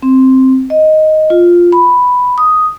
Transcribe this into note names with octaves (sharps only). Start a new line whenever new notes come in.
C4
D#5
F4
B5
D#6